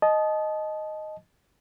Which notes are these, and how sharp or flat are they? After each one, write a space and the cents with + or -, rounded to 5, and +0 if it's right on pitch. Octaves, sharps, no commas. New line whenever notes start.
D#5 +0 A5 -30